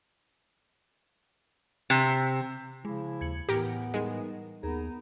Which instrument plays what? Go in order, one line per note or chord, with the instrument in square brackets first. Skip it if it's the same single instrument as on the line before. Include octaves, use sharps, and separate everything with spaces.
[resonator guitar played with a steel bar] C3
[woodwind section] C#3 F3 E4 [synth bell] G#3
[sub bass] D#2 [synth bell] G#6 C#7 F#7
[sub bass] A2 [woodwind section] E3 B3 [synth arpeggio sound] G4 A#4
[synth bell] G3 D#4 A#4 [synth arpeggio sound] G#3
[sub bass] D#2 [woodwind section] B3 D#4 [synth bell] G#4 A#4